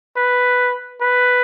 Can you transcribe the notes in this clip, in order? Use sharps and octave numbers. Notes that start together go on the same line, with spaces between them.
B4
B4